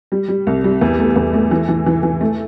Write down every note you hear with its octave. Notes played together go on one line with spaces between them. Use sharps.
G3
G3
C2
G3
E2
A3
E2
A3
E3
E3
E3
E3
A3